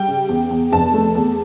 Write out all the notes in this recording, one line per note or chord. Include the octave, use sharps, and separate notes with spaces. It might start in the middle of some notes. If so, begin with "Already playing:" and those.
Already playing: G3 G5
C#3
E2
E2
F1 A5
A3
E2